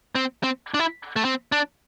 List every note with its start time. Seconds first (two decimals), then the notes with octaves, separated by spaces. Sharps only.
0.15 C4
0.43 C4
0.74 D4
0.79 E4
1.16 A3
1.25 C4
1.52 D4